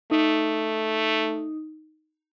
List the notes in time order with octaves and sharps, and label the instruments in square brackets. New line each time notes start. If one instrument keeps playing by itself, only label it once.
[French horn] A3 [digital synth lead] D#4